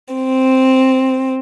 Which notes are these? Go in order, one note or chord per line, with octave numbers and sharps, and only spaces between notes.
C4